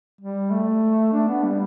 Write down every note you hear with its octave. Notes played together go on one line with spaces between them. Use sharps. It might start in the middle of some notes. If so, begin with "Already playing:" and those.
G3
A3
D4
B3
G3